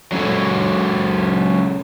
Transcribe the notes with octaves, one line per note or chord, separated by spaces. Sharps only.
F#3 G#3 C#4 A4